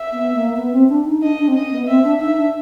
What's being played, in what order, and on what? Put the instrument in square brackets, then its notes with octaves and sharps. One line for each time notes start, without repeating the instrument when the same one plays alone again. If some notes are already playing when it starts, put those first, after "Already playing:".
Already playing: [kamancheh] E5
[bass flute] B3
A#3
B3
C4
D4
D#4
[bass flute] D4 [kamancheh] D#5
[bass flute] D4
C4
[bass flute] C#4 [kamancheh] D#5
[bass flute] B3
[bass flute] C4 [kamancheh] E5
[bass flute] D4
[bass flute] D#4 [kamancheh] E5
[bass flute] D4